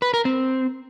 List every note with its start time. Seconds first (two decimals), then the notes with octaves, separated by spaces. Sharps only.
0.02 B4
0.14 A#4
0.25 C4